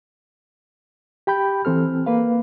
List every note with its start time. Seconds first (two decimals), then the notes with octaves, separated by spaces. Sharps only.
1.27 G4 G5 B5 G6
1.65 E3 C4 A4 F6
2.06 A#3 B4 F5